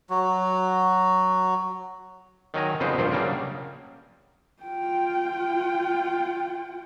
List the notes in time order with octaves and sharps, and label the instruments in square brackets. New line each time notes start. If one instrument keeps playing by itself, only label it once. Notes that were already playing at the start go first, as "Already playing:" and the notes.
[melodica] F#3 F#4
[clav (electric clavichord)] D#3 F#3 G#5 A#5
F2 A#2 C#3 B3 C5
A#1 G2 A#2 C5
C#3 F#3 G3 A#3 D4
[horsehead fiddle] F4 G5